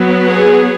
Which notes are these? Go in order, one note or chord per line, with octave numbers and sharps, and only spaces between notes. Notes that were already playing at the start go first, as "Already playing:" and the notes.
Already playing: F#3 B3
G#4